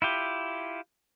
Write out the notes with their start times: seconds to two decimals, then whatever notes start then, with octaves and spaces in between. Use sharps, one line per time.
0.02 E4 F4 G4